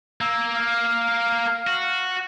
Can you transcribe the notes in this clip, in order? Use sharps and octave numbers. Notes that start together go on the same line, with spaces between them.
A#3 E6
F5
F#4